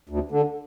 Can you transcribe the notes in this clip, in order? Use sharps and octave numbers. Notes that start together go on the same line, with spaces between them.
D2
D3